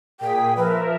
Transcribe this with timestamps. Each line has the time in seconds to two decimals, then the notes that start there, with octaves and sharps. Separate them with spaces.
0.20 A#2 G#4 G5 B6
0.56 F3 A#4 B4 E5